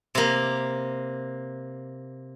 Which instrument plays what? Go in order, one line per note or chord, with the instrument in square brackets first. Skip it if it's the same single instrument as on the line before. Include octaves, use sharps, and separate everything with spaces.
[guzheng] C3 A#3